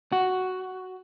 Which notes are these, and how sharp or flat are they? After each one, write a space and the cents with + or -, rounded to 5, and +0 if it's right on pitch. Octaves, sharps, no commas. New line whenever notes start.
F#4 +5